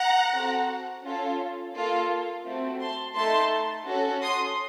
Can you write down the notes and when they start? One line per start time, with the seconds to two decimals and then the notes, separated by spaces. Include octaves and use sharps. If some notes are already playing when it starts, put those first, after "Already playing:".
Already playing: F#5 A#5
0.33 C4 F#4 A4
1.03 C#4 F4 A4
1.73 A#3 F4 A4
2.44 A3 C4 F#4 A4
2.80 A5 C6
3.15 A3 D#4 A4 A5 C6
3.86 C#4 F#4 A4
4.22 C6 D#6